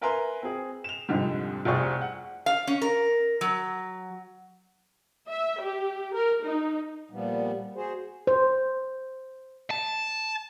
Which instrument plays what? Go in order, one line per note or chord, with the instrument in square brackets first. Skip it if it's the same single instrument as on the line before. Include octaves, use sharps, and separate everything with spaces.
[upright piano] A#4 B4 E5 G#5 A#5 C6
C4 G#4
E7 F7
C2 F2 G#2 D3 G3
F1 C2 C4 G#4 D5 C#6
F#5
[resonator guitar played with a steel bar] F5
C#4
A#4
F#3
[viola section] E5
G4
A#4
D#4
[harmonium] A#2 F3 G3 B3
F#4 G#4 C5
[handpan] C5
[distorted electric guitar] A5